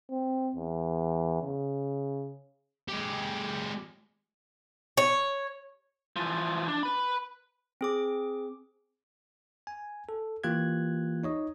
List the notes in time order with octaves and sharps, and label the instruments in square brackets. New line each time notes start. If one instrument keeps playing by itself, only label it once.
[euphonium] C4
E2
C#3
[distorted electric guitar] G#3 G4
[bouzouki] C#5
[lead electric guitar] E3 F3
D4
B4 B5
[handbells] C4 G#4 D6
[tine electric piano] G#5
A4
E3 A#3 F4 G4 F#6 G#6
D#4 C#5 D#5